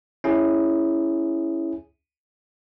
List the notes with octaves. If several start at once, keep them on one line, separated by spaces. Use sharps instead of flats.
C#4 E4 G#4